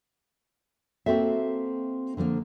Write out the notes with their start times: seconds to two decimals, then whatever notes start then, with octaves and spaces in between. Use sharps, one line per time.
1.06 A#3 C4 F#4 A4 E5
2.17 D3 F3 F#3 A#3